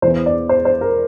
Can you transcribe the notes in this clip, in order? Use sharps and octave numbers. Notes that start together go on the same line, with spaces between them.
E2 E3 C5
D5
C5
C5
A#4